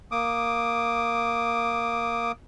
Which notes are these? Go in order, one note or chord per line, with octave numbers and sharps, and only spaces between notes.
A#3 D6 D#6